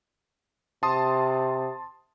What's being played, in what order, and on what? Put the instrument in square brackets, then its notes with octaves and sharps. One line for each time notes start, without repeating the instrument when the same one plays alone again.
[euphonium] C3 [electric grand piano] A5 C6 D#6